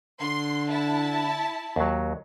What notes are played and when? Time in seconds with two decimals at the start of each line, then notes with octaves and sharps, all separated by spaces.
0.21 D3 C6
0.70 E4 A5
1.76 D#2 F#3